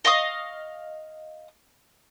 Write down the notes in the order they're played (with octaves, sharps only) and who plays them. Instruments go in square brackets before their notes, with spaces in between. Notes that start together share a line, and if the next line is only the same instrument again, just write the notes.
[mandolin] D#5 F5 C#6 D#6